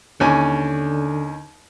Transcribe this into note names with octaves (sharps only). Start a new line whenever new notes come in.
D#2 D3 C#4 G#5